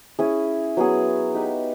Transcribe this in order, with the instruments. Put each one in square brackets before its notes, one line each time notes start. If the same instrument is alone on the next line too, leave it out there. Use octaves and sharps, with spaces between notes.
[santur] C#4 E4 G#4
F#3 B3 E4 G#4
D#4 G4 B4